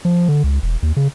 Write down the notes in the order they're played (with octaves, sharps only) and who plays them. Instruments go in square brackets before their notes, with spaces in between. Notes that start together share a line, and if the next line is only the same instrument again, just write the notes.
[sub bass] F3
D3
C#2
E1
D#2
C#3